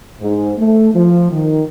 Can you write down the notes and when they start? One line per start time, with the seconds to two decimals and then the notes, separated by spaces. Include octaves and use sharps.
0.21 G#2
0.57 A3
0.95 F3
1.31 D#3